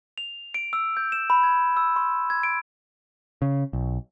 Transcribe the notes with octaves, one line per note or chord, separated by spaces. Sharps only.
F7
D7
E6
G6
E7
B5
G#6
E6
C6
G#6
D7
C#3
B1